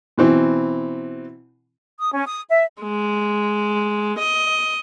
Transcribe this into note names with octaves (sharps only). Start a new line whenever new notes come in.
B2 E3 C4
D#6
C#4
D#6
E5
G#3
D#5